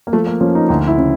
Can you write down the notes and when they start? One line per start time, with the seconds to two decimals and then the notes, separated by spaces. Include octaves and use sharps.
0.07 A#3
0.13 F3 A3
0.27 A#3
0.41 F3 C#4
0.55 D#4
0.69 D2 D#4
0.87 E4
0.97 C#3